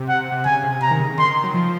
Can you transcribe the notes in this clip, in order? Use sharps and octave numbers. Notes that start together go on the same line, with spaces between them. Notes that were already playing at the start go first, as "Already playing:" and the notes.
Already playing: C3
F#5
C3
C#3 G#5
C3
C3 A#5
D#3
C#3
C#3
D#3 C6
F#3
F3